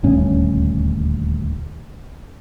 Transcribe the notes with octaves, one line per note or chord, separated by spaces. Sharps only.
D#1 D2 G2 C#4